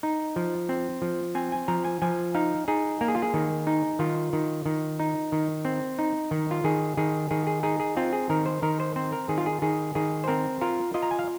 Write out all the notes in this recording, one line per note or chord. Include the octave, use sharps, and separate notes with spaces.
D#4
F3
C4
F3
C4 G#5
G#5
F3 A#5
G#5
F3 G#5
D#4 F5
D#4 G#4
A#3 A#4
G#4
F4
G#4
D#3
D#4
D#3 F4
D#3
D#3
D#4
D#3
C4
D#4
D#3
F4
D#3 G#4
D#3 G#4
D#3 G#4
G#4
D#4 G#4
G#4
C4 F4
G#4
D#3 A#4
C5
D#3 A#4
C5
C4 C5
A#4
D#3 G#4
F4
G#4
D#3 G#4
D#3 G#4
C5
C4 A#4
F4 A#4
F4 D#5
A#5
G#5
F5